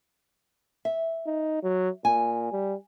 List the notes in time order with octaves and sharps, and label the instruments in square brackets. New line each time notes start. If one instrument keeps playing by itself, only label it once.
[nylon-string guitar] E5
[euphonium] D#4
F#3
[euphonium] A#2 [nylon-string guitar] G#5
[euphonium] G3